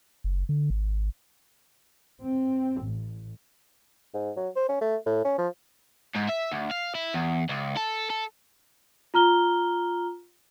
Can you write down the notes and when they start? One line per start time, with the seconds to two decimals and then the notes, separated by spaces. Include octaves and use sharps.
0.24 F#1
0.49 D3
0.70 G#1
2.23 C4
2.82 A1
4.14 G#2
4.37 F#3
4.56 C5
4.69 C#4
4.81 A3
5.06 A2
5.25 C#4
5.38 F3
6.16 G#2
6.29 E5
6.52 D2
6.71 F5
6.95 E4
7.14 E2
7.49 C#2
7.77 A4
8.10 A4
9.14 F4 A#5 F6 G7